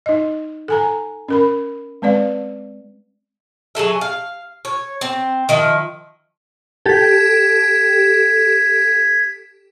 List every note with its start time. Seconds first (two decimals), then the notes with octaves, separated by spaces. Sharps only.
0.06 D#4 D#5
0.68 A4 G#5 A#5
1.28 C#4 A#4 B5
2.02 G#3 C4 B4 D5 F5
3.75 F#3 G#4 A4 E5
4.01 F5
4.65 C#5
5.01 C4
5.49 D#3 F3 E5
6.86 G4 A4 G#6 B6